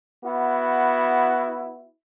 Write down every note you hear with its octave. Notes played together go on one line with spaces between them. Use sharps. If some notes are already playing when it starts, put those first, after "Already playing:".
B3 E4 F#4